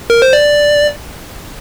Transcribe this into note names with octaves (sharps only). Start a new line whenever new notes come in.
A#4
C5
D5